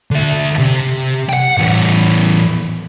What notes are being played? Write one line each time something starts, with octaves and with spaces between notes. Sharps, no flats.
D3 E5
C3
F#5 G5
E2 A2